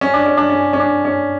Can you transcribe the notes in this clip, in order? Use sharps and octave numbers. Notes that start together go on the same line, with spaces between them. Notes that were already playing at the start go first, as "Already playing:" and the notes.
C#4
D4
C#4
D4
C#4
C#4
D4
C#4